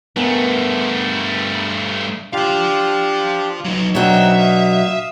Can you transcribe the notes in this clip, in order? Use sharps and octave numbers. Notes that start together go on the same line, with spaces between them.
G2 A3 B3 A#4 G#5
F3 D4 F4 G4 F5
F#3 D#4
B2 F#3 C4 D4 D#4 E5
F5 D#6